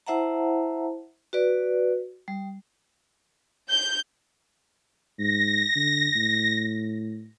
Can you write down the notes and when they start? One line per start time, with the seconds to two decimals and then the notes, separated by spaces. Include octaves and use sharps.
0.07 E4 C5 E5 F#5 A5 A#5
1.33 F#4 B4 D5
2.28 G3
3.70 G6
5.18 G#2 A#6
5.75 D3
6.15 A2